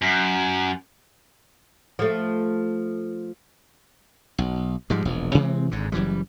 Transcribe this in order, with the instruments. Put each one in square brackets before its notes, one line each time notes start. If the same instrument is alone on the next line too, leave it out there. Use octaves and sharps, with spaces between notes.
[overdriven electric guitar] F#2
[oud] F3 A3
[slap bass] B1
G#2 F3 G3 G#3
E1 A#1
C3 E3 G#3 C4
G#1 G#2 D3
F#1 F#2 E3 G3